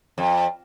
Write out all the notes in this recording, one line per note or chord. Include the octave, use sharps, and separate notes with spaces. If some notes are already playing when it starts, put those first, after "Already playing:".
F2